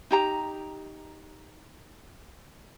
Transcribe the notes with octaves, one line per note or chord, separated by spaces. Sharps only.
D#4 G4 A#5